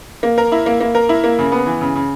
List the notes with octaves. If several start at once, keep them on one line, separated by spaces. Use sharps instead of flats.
A#3
A#4
E4
A#3
A#3
A#4
E4
A#3
C#3
B3
E3
C#3
C#3